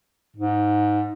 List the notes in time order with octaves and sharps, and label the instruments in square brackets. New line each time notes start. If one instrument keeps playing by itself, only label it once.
[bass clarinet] G#2